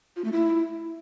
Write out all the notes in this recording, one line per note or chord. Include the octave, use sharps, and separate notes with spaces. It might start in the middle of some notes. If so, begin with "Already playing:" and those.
F4
A3
E4